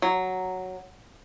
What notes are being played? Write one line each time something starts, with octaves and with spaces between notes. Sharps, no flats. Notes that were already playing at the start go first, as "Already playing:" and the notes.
F#3